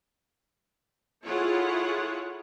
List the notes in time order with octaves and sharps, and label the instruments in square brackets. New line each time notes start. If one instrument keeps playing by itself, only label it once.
[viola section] E4 F4 G#4 A4 C#5 F#5